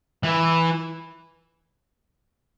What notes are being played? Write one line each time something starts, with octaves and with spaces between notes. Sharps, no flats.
E3